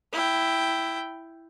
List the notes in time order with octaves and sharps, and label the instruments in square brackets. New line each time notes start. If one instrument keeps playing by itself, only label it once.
[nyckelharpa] E4 G5